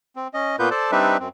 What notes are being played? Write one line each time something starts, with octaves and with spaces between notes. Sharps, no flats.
C4
C#4 D#5
A#2 A#3 B3 F4 B4 G6
A4 C5 D5 A5
G3 C4 D4 D#4 B4 E5
F#2 C4